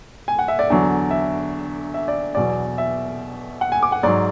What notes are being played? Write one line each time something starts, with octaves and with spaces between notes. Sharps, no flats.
G#5
F#5
E5
D5
E2 D3 F#3
E5
E5
D5
E2 B2 F#3 D5
E5
F#5
G#5
D6
F#5
G#2 F#3 D5